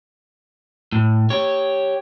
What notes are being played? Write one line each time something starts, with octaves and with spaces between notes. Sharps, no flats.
A2
G4 C#5